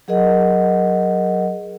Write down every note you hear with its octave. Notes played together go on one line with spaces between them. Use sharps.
F#3 G#4 A#4 D#5 F#5